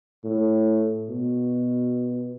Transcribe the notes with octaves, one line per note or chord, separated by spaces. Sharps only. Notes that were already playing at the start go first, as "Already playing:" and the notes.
A2
B2